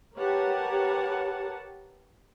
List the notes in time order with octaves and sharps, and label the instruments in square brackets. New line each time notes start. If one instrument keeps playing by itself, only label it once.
[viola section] G4 A#4 B4 C#5 F#5 A5